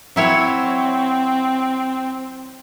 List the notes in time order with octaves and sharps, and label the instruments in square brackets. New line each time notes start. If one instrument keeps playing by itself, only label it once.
[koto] F#3 E4 C#5 [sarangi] C4